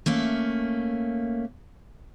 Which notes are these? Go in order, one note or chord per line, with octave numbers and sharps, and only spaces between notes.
A3 A#3 C#4